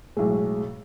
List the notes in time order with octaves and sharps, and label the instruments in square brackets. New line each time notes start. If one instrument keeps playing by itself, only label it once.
[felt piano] B1 A2 [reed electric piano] G#3 G#4